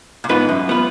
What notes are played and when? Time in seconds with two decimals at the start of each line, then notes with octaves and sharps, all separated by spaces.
0.24 A#2
0.29 G#2 B3 F4 B4
0.49 F#2
0.69 B3 F4 B4